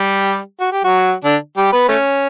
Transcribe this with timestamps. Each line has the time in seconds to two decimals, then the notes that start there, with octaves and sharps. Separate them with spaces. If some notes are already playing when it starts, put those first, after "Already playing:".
Already playing: G3 G4
0.60 F#4
0.72 G4
0.84 F#3 F#4
1.25 D3 D4
1.57 G3 G4
1.72 B3 B4
1.88 A3 C#4